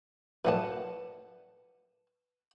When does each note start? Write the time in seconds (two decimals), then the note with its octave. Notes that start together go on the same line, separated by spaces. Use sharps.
0.45 F#2 A2 D4 B4 F#5 A5